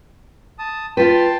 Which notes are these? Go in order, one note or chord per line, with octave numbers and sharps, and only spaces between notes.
A5 D#6
F4 B4 G5 A5 C6